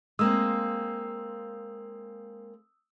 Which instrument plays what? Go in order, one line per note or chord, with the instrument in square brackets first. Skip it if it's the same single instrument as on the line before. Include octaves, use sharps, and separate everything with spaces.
[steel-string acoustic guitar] G#3 A#3 C4 [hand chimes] D#6 E6